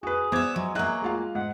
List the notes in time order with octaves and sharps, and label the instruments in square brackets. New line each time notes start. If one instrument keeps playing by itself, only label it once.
[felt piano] F#4 B4 [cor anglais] G#4
[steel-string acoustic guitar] B3 E5 [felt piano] C5 D6 G#6
[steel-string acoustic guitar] F#3 [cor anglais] G#3
[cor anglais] F#3 [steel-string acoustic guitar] A#3 G#4 [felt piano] D#5 E5 F#6
[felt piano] G#3 F4 F5
[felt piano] G#2 [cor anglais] F#5